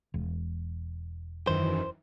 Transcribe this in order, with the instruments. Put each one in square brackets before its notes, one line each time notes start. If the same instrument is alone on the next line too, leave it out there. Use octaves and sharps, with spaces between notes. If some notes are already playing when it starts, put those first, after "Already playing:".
[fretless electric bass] E1
[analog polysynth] F#2 D#3 E3 [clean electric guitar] C5